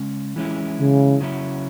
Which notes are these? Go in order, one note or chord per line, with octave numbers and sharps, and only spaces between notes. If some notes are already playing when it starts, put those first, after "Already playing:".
Already playing: C#3 G#3 C#4
E3 G#3 C#4 E4
C#3
C#3 F#3 C#4 E4